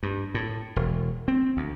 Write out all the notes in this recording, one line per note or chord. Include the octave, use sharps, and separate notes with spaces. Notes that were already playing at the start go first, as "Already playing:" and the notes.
G2
A2
E1
C4
D2